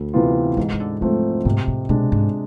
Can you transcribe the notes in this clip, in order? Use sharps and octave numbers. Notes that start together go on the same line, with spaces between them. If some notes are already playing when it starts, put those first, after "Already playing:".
Already playing: D2
C3 E3 B3 F4
G#2 E3
E3
D3
F3 G#3 A3 C4
G#2 C3
A2
B2 G#3 D4
G#2